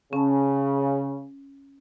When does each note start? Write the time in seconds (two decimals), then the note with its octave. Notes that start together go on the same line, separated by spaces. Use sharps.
0.13 C#3 C#4 A5